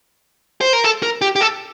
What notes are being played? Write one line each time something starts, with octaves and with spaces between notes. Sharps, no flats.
C5
A#4
A4
A#4
G4
G4
A4